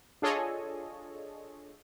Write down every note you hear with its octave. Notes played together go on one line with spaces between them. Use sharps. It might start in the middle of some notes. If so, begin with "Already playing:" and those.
D4 F4 G#4 A4 C#5 D#5